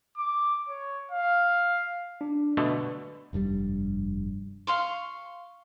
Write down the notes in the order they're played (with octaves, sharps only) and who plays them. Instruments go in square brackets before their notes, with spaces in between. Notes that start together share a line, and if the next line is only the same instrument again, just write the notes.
[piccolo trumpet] D6
C#5
F5
[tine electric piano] D4
[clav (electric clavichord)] B2 D3 A3 [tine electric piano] B4
[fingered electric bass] F1 G2 C3 G3
[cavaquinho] F5 C6 C#6